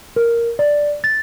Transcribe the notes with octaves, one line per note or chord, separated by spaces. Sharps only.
A#4
D5
A6